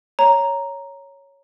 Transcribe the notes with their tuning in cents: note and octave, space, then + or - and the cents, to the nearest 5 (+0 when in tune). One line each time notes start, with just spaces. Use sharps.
C#5 +0 A#5 +0